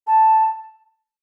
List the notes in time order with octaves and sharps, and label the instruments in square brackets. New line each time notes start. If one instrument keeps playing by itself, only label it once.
[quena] A5